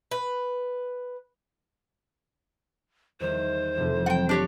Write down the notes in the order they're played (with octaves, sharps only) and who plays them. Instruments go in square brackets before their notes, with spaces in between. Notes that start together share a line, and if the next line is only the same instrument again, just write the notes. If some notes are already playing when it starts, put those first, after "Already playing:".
[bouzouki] B4
[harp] E2 D#3 G3 [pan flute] C5
[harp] F1 F2
[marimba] E3 F#3 C4 [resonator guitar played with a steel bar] F#5 G5
[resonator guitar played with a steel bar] D4 G4 C#5